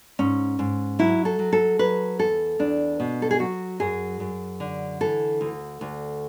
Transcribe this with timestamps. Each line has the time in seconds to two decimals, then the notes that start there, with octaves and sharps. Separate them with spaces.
0.19 G#2 C#4
0.59 G#2
0.99 F#3 E4
1.25 A4
1.39 F#3
1.53 A4
1.79 F#3 B4
2.19 E2 A4
2.59 E2 D4
3.00 B2
3.22 A4
3.31 G#4
3.39 F#3 F#4
3.80 F#2 G#4
4.20 F#2
4.60 D3
5.01 E3 A4
5.41 D2
5.81 D2